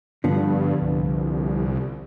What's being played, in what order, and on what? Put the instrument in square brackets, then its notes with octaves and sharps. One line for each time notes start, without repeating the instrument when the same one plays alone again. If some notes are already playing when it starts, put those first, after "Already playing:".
[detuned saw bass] G2 [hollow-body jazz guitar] D3 F3 B3
[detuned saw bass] C2